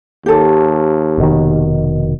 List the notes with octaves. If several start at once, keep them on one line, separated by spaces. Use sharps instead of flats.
D#2 G4 A4
F1 B2 D#3